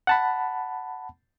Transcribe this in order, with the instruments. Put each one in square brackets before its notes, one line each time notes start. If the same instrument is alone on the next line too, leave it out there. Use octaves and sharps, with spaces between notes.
[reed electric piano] F#5 A5 B5